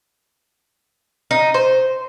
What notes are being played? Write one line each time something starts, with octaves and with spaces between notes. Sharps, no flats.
D#4
C5